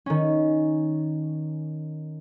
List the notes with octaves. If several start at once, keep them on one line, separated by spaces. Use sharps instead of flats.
D#3 C#4